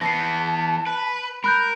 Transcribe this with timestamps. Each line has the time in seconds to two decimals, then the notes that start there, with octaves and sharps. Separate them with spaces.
0.01 E3 B3 A5 A#6 C7
0.86 B4
1.44 A#4 B5 F#6 G6